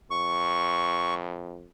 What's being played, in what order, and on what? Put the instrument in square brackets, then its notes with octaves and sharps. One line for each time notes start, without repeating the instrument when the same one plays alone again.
[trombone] F2 [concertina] C#6